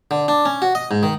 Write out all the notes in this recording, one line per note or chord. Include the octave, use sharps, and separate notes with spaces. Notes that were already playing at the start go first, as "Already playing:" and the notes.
D3
D4
C#4
F#4
D#5
G#2
D#3